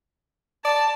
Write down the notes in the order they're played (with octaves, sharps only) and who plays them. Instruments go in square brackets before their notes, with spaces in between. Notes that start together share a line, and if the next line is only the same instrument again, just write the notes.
[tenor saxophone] D5 [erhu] A5